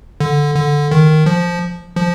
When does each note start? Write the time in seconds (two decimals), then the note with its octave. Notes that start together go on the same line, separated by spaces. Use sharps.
0.20 D3
0.55 D3
0.91 D#3
1.26 F3
1.96 F3